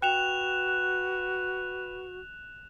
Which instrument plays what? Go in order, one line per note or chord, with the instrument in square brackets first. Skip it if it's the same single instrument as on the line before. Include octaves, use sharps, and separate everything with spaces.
[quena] F#4 [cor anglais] B4 [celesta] G5 [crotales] F#6 E7 F7